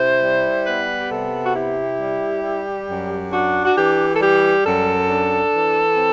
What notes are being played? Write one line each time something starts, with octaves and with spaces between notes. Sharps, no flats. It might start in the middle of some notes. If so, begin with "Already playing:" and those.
Already playing: C3 E4 C5
G3
B3 B4
G4
C3 A4
F#4
E4 G4
G3
G3
F#2
D4 F#4
F#4
E3 G4
A4
G3 G4
F#2 A4
D4
E3
C4